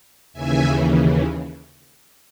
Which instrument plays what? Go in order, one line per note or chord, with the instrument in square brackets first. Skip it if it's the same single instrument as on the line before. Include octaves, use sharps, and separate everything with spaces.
[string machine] D#2 C#3 E3 E5 G#5